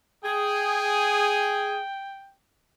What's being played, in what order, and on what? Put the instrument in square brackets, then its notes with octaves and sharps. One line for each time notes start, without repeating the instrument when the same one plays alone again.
[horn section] G#4 [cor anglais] G5